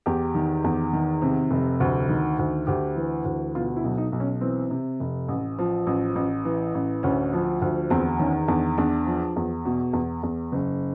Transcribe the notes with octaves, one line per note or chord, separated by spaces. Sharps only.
E2 G4
D#3
E2
D#3
C3
F1
D2
D#3
D2
D2 G4
E3
D2
B2 F4
E4
B1
D#4
B1
C#4
E3 C4
C3
F1
A1
F3
A1
A1
E3
A1
D2 C#4
F3
D2
E2 C4
D#3 C#4
E2 D4
E2 D4
F3
E2
B2
E2
E2
F#1